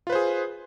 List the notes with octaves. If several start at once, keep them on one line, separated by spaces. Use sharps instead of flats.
F4 G#4 B4 C5